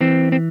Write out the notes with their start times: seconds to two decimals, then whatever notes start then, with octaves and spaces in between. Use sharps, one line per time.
0.01 E3 C4
0.32 C4